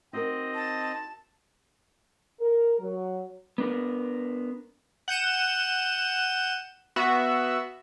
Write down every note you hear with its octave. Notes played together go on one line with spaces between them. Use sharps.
C4 D#4 F#4 A#4 D#5
A5
A#4
F#3
B3 D4 A#4
F#5 G6 D#7 E7
B3 F#4 E5